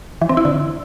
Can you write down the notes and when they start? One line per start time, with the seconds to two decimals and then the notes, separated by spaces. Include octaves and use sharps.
0.21 E3
0.29 C4
0.37 E4
0.45 D3